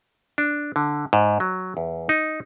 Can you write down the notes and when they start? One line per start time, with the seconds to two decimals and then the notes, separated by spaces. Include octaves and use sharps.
0.38 D4
0.76 D3
1.13 G#2
1.40 F#3
1.77 E2
2.09 D#4